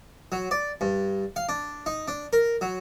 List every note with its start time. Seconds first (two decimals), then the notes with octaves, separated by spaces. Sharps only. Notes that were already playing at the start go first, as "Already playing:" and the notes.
0.32 F#3
0.51 D5
0.81 G2
1.36 F5
1.49 D4
1.86 D#4
2.08 D4
2.33 A#4
2.61 F#3